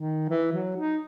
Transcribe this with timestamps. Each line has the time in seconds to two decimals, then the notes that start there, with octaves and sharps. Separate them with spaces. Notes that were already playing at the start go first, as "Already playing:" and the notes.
Already playing: D#3
0.29 E3
0.53 F#3
0.76 D#4